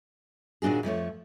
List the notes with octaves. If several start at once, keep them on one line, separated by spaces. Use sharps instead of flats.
D#2 A#2 D4 F#4 G#4
F2 F3 A3 C#5